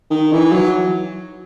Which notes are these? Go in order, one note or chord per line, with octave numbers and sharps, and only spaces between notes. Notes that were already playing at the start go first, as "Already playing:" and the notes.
D#3
E3
F#3